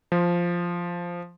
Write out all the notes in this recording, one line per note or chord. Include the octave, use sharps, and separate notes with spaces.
F3